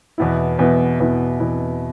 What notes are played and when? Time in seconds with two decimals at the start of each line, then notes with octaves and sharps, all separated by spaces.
0.18 E2 B2 B3 E4
0.59 E2 B2 B3 E4
1.00 E2 B2 B3 E4
1.40 E2 B2 B3 E4